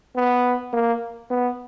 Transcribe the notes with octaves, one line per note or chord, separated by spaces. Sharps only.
B3
A#3
B3